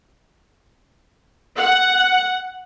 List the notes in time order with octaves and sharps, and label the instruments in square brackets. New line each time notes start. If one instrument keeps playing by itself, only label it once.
[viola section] F#5